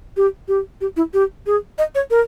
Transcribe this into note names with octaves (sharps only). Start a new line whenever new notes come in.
G4
G4
G4
E4
G4
G#4
D#5
C#5
A#4